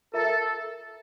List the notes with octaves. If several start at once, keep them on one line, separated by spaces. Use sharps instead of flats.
F4 A4 A#4 E5 A#5